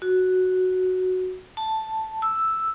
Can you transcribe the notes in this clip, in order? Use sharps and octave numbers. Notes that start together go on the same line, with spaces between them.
F#4
A5
E6